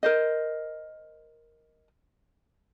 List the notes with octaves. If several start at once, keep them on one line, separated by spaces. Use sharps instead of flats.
A#4 C5 D#5